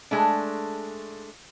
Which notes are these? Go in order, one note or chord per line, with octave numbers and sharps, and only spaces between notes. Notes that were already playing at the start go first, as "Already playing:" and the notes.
G#3 A3 D4